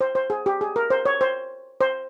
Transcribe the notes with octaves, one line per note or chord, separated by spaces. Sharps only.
C5
C5
G#4
G4
G#4
A#4
C5
C#5
C5
C5